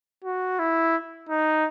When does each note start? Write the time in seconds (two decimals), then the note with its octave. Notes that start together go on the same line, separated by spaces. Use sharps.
0.24 F#4
0.59 E4
1.29 D#4